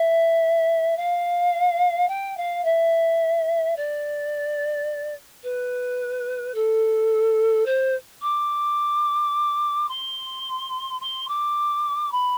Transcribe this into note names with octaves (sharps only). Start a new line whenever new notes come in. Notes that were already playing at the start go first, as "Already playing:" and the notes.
Already playing: E5
F5
G5
F5
E5
D5
B4
A4
C5
D6
C6
C6
D6
B5